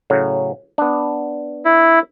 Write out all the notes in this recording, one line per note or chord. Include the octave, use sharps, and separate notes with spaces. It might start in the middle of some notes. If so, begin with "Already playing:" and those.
A2 C#3 F#3
B3 D4
E4